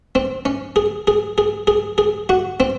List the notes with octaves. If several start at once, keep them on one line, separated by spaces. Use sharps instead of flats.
C4
C#4
G#4
G#4
G#4
G#4
G#4
F#4
C4